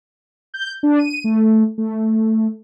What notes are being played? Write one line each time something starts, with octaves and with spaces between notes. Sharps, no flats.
G6
D4
D#7
A3
A3